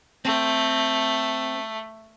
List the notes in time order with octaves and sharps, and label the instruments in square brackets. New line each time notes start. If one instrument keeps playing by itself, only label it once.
[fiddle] A3 [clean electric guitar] C4